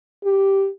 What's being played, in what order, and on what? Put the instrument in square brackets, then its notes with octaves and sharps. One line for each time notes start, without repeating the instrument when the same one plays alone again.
[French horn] G4